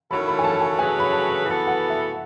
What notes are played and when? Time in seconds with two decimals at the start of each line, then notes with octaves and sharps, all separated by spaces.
0.10 D#3 F#3 C#4 E4 A4 B5
0.28 B5
0.39 G#5
0.44 A5
0.61 G#5
0.79 F#3 A3 C#4 G#4 B4 G#5
1.00 B5
1.11 A5
1.45 E3 B3 F#4 A4
1.67 F#5
1.90 E5